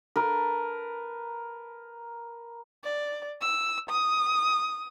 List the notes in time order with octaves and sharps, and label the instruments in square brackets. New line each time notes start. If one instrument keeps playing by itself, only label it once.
[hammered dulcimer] A#4 B4 A5
[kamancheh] D5
E6
D#6